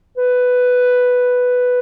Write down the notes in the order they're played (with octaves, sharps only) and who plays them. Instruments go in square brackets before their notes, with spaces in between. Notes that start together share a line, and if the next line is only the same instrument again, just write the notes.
[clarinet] B4